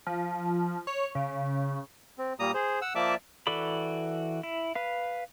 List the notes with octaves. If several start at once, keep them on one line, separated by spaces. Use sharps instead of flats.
F3
C#5
C#3
C4
A#2 G3 A#3 A#5 D#6
G#4 C5
F#5 E6
F3 A#3 D5 E5 A5 D6
E3 F#4 A4 D5 B5
E4
B4 F5